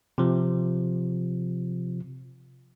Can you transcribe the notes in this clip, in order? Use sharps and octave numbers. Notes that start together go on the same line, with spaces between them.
C3 F3